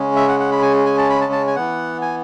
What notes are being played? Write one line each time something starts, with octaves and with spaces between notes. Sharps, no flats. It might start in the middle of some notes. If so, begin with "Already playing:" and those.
Already playing: C#3 G#3 C#4
E5
F#5
F#5
B5
G#5
G#5
A5
B5
A5
A5
G#5
E3 B3 F#5
G#5